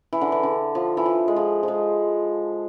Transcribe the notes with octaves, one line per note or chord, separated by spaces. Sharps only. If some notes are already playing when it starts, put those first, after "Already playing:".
E3
D3
E3
D3
F3
E3
F3
G#3
F3
F3
G#3